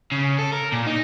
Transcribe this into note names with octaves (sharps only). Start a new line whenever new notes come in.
C#3
A4
A#4
A#2
D#4